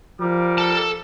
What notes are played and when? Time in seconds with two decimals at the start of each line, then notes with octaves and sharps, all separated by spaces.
0.20 F3 G3 A#4 D6
0.58 A4 A5